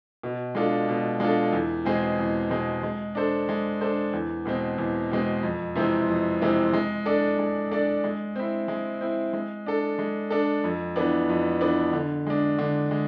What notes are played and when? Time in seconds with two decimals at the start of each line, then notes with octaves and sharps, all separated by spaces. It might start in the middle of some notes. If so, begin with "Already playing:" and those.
0.23 B2
0.55 G#3 D4 F4 A4
0.89 B2
1.20 G#3 D4 F4 A4
1.53 E2
1.85 B2 G#3 C4 G#4
2.19 E2
2.50 B2 G#3 C4 G#4
2.83 G#3
3.15 D4 A4 C5
3.49 G#3
3.81 D4 A4 C5
4.13 E2
4.45 B2 G#3 C4
4.78 E2
5.11 B2 G#3 C4
5.43 F2
5.75 C3 E3 G#3 C4
6.08 F2
6.41 C3 E3 G#3 C4
6.73 G#3
7.06 D4 A4 D5
7.39 G#3
7.71 D4 A4 D5
8.04 G#3
8.36 C4 E4
8.68 G#3
9.01 C4 E4
9.33 G#3
9.66 D4 A4
9.99 G#3
10.30 D4 A4
10.64 F2
10.96 E3 B3 D4
11.29 F2
11.61 E3 B3 D4
11.93 D3
12.27 G#3 D4
12.59 D3
12.91 G#3